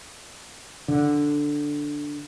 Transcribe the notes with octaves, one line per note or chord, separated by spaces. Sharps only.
D3